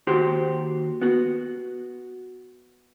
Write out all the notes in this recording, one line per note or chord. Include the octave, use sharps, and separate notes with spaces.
D#2 F#4 G4 C5
B3 F#4